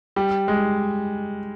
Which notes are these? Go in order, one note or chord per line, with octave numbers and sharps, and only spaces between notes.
G3
G#3